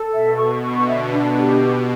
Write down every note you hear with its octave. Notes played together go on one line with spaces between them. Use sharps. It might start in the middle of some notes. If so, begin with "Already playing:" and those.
Already playing: A4
B2 E5
C#6
D3 C#6
E5
B2 D4
G4